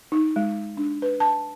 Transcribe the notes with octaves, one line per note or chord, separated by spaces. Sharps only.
D#4
G#3
D4
B4
A5